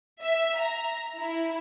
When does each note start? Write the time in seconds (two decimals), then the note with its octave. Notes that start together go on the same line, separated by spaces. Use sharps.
0.21 E5
0.59 A#5
1.18 E4